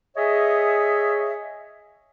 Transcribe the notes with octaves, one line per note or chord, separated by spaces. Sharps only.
G#4 C#5 D#5 E5